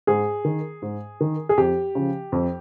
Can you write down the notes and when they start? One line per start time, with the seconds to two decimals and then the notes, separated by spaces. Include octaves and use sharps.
0.07 G#2 G#4
0.45 D#3
0.82 G#2
1.21 D#3
1.49 G#4
1.58 F2 G4
1.95 C#3 F3
2.32 F2